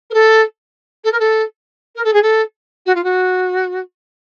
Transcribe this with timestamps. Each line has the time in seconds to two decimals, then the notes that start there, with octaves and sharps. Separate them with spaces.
0.10 A#4
0.13 A4
1.04 A4
1.12 A#4
1.19 A4
1.95 A#4
2.04 A4
2.13 G#4
2.22 A4
2.86 F#4
2.95 F4
3.03 F#4